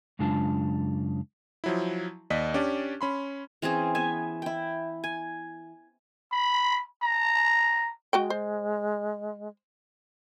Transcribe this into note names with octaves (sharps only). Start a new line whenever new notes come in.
F#2 C#3 G#3 D4 F4 A5
F3 F#3 E4
D#2 D5 D#5 B6
C#4 D4 G4 D5
C#4 B5 C6
E3 C4 C#4 G#4
B3 E5 G#5
E4 G5
G#5
B5
A#5
G#3 F#4 D#5 G5
C5